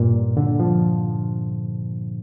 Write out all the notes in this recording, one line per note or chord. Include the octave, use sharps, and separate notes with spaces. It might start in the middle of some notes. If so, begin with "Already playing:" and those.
Already playing: G2 A#2
D3
F3